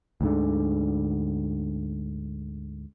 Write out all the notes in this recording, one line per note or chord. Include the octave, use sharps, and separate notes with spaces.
D2 G#2 D3